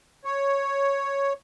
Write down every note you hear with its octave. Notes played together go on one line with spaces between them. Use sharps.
C#5